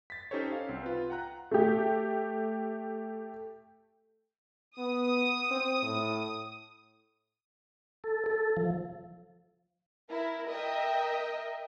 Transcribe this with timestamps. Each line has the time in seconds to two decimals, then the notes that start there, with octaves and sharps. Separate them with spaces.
0.10 A6 B6
0.31 C#4 D#4 G4 A4 C5 C#5
0.52 F5
0.69 C2 C4
0.83 F4 B4
1.10 F#5 G5 A#5 F#6
1.51 A3 G4
4.78 B3 D#6
5.51 C4
5.82 A2
8.04 A4
8.26 A4
8.57 F3
10.09 E4 A#4
10.47 A#4 D#5 E5 G5